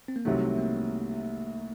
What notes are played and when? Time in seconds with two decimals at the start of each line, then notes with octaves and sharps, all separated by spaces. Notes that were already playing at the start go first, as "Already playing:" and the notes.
0.08 C4
0.16 A#3
0.25 C2 C3 D#3 F#3 A3
0.58 A#3